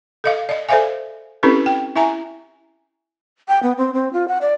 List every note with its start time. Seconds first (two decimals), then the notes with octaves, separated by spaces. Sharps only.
0.24 A4 D#5 F5
0.49 D5 D#5
0.69 A4 C5 D5 E5 F5 G#5
1.43 C4 C#4 E4 G4 A4 B4
1.66 G5
1.96 E4 E5 G#5 A#5
3.48 G5
3.63 B3
3.78 C4
3.93 C4
4.13 F4
4.28 F#5
4.41 D5